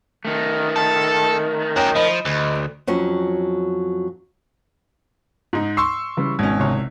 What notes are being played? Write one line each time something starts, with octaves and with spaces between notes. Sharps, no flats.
D#3 A3
A4
F#4 A#4 C#5 G5
F3 D#5 B5
D2
F2 F#3 C#4
G#2 D#4
C6 C#6 E6 C7
C#3 E3 G3
G#1 B2 C#4 G#6
C2 C3 C#5